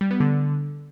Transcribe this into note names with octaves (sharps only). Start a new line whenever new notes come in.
G3
B3
D3